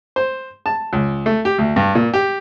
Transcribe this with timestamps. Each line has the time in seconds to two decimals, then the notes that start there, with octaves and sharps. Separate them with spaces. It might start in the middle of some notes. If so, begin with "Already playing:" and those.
0.16 C5
0.66 A5
0.93 C#2
1.26 A3
1.45 G4
1.58 D2
1.76 G2
1.95 A#2
2.14 G4